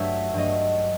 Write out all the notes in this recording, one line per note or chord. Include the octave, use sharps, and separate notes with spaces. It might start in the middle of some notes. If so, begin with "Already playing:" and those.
Already playing: G2 F#3 A3 E5
G2 F#3 A3 D#5